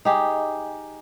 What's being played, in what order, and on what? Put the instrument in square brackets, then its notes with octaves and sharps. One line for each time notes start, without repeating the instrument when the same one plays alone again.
[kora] D#4 G4 G#4